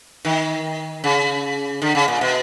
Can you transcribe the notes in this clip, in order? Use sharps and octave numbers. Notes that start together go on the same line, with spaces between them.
D#3
C#3
D3
C#3
A#2
B2